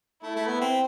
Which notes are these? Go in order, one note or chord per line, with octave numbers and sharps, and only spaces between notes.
A3 E4
A3
B3
C4